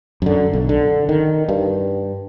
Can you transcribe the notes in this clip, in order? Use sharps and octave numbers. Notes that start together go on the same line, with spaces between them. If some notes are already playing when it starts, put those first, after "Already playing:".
F#2 D3
B1
D3
D#3
G2